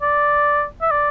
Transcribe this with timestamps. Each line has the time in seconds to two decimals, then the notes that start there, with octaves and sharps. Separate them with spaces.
0.02 D5
0.82 E5
0.91 D5